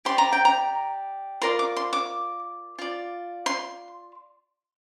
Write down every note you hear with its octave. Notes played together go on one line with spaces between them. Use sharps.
G4 D5 C6
A#5
G5
A#5
F4 A#4 D5 C6
D6
C6
D6
F4 D5
C6